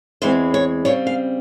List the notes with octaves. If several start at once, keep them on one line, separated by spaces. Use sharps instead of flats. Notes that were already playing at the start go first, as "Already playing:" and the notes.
E2 E3 G#3 C4 C5
C#5
C#3 G3 C4 C#5
F5